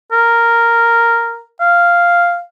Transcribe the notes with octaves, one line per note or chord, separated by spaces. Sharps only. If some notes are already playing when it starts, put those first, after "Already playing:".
A#4
F5